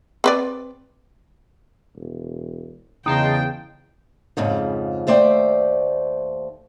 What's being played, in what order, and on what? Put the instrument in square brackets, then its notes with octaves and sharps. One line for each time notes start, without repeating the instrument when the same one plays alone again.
[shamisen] C4 B4 D5
[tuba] E1
[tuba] E2 [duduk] C#3 [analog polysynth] D#4 A5 C6 [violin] G5
[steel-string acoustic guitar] F2 G#2 C#3 F3
D#2 A3 C5 D5 G5